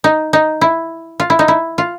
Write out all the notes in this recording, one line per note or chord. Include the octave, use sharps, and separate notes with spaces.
D#4
D#4
E4
F4
E4
D#4
E4
F4